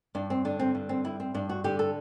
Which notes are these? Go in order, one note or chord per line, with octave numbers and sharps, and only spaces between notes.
G2 D4
C4
D3 D4
C4
G2
C4
G3 E4
C4
G2 D4
F#4
D3 G4
A4